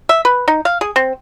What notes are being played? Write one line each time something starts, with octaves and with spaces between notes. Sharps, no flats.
E5
B4
D#4
F5
G#4
C4